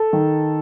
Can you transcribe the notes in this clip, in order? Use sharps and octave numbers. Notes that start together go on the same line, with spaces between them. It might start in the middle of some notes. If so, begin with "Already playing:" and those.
Already playing: A4
D#3